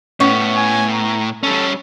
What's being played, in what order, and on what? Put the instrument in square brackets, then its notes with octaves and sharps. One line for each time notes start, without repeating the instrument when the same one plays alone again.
[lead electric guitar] A2 [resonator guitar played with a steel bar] B3 C#4 C#5
[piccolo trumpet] G#5
A#5
[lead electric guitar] G3 C#4 [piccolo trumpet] A4